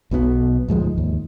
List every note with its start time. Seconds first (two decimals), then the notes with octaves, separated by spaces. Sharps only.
0.11 B1 B2 D3 B3
0.68 D2 G#2 F3 G#3
0.98 D#2